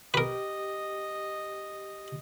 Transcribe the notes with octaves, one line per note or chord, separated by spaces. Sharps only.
G4 A#4 B4 D#5